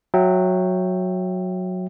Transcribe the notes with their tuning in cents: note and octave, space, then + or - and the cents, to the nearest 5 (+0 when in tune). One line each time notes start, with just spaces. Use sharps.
F#3 -10 E5 +5 G5 +0